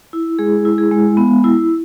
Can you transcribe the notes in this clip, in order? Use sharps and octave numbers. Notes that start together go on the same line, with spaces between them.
E4
G#3 G#4
E4
G#4
G#3
B3
E4